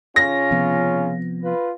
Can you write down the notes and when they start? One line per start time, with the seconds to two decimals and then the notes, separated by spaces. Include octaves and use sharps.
0.16 C#3 C#4 F4 A#6
0.51 C3 F3 B3
1.43 F4 B4